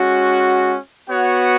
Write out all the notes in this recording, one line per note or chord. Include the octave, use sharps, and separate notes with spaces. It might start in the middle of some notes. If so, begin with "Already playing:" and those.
Already playing: G#3 C#4 F#4
B3 F#4 C#5 F#5